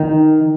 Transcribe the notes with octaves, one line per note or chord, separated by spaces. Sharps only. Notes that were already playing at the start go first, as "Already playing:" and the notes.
Already playing: D#3